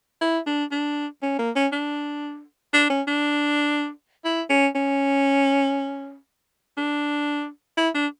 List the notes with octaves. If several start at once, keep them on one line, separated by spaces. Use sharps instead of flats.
E4
D4
D4
C#4
A#3
C#4
D4
D4
C#4
D4
E4
C#4
C#4
D4
E4
D4